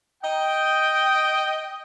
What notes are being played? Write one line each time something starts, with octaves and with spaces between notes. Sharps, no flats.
D#5 G5